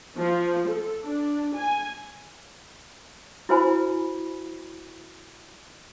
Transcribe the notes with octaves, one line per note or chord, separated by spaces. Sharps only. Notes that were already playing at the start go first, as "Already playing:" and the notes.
F3
A4
D4
G#5
E4 F#4 B4 C5 G#5 B5